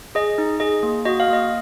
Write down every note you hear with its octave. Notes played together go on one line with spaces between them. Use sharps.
G#4 D#5
D#4
G#4 D#5
A#3
F#4 D#5
F5
A#3 D#5